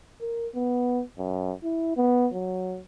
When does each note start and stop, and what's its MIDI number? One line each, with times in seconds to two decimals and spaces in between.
0.21 0.47 70
0.55 1.03 59
1.18 1.52 42
1.63 1.96 64
1.97 2.28 59
2.33 2.79 54